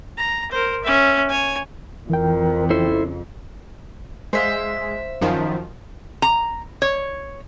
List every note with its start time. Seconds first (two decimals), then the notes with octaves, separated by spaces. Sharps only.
0.18 A#5
0.51 A#4 C5
0.83 C#4 E5
1.29 C#5 G#5
2.10 F2 E3 A#4 G5
2.70 C#3 E4 A4 C5
4.33 G#3 C5 E5 F5
5.21 F#2 D#3 F3
6.22 A#5
6.82 C#5